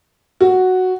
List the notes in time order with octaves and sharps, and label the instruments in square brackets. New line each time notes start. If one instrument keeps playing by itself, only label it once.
[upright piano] F#4